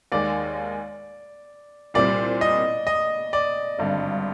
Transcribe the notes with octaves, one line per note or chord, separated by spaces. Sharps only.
D#2 D#3 G#3 D5
C2 A#2 G3 C4 D5
D#5
D#5
D5
G#1 G2 D3